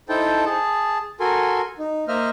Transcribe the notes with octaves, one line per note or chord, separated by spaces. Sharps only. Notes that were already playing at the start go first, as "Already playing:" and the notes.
D#4 E4 A4 C5 G5 A5
G#4 A5
F#4 A4 A#4 G#5 C6
D#4
A#3 C5 D#5 E5 F6